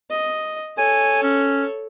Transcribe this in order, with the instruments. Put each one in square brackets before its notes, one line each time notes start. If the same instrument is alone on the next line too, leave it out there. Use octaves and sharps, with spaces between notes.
[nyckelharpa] D#5
[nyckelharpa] A4 C#5 [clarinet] G#5
[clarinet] C#4